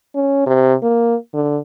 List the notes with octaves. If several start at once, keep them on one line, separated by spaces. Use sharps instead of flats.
C#4
C3
A#3
D3